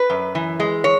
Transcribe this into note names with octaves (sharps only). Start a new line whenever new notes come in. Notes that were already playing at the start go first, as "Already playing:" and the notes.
Already playing: B4
F#2
E3
G#3
C#5